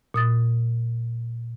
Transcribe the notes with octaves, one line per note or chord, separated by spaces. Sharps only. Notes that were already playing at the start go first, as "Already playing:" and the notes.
A#2 D#6 A6